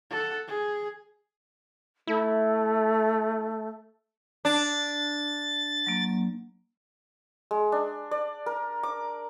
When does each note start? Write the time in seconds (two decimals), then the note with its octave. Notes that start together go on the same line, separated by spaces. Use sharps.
0.10 A4 F#5
0.48 G#4
2.07 A3 E4
4.45 D4 A6
5.86 F#3 A#3
7.51 G#3
7.72 D4
8.11 D5
8.46 A#4
8.83 D6